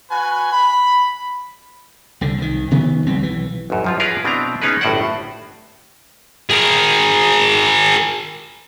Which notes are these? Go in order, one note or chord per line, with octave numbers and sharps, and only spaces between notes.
F#4 B4 G#5
B5
C2 D3
C2 D#3
C3 D#3 F#3 B3
C#2 G3 C4
B1 E3
A1 F#2
F#2 F3 F4
F4 G#4 A#4 B4 F5
B2 C4 D4 E4 A#5
B3 C#4 D#4 G#4 A#4 B4
G1 A2 F#4 C5 D5 F#5
G#4 A#4